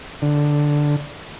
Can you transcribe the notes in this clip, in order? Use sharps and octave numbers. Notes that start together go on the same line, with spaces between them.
D3